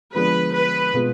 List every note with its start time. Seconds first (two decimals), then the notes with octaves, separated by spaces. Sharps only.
0.14 D3 F3 G#3 B3 D4 B4
0.54 B4
0.94 B2 G#3 B3 F4